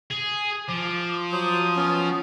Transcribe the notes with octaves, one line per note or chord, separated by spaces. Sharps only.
G#4
F3 D6
F#3 C5 D6 D#6
B3 C#4